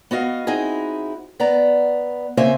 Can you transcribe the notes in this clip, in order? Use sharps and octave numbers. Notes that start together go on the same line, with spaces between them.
B3 F#4 D#5 F5
C4 D#4 E4 F#4 G#4
B3 D5 A#5
C#3 A#3 C4 C5 E5 G#5